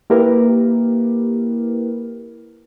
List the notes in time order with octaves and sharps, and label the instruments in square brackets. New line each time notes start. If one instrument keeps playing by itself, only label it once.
[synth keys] A#3 E4 G4 A#4 B4